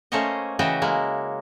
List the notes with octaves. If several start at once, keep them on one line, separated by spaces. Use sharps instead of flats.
A3 A#3 C#4 C5 C#5 D#5
C#3 E3 F#4 D#5 E5 G5
G#3 A#3 E4